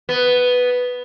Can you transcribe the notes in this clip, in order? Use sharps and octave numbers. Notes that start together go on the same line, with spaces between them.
B3